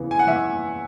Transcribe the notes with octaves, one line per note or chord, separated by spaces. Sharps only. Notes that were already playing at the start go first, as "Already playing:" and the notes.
Already playing: E2 C#3 E3 B3
G#5
F#5
E2 E5